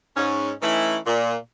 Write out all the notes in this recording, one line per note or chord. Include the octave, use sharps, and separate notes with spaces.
G#2 C#4
E3 A3 C#4 D#4 E4
A#2